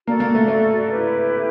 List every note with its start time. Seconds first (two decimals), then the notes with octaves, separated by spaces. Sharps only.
0.07 A#3 F#4 A4 D5
0.20 A#3
0.35 A3
0.48 A3
0.90 E4 G4 B4